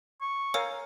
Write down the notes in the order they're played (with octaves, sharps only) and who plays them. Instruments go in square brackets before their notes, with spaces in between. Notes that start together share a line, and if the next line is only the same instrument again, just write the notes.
[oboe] C#6
[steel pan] A#4 F5 G#5 [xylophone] C#5 E6 C#7